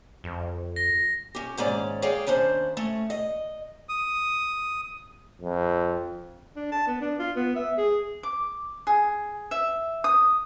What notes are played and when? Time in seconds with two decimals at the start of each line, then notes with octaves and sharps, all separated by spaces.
0.24 F2
0.76 A#6
1.35 C#4 G4
1.57 D#2 G#2 C#4 D5
2.02 G#4 C#5 D5 F5 G5
2.26 D#2 C#4 D4 C5
2.77 A3 C#4
3.10 D#5
3.89 D#6
5.41 F2
6.56 D4
6.72 A5
6.87 B3
7.01 D4
7.19 F4
7.36 B3
7.56 E5
7.78 G#4
8.23 D6
8.87 G#4
9.51 E5
10.04 D#6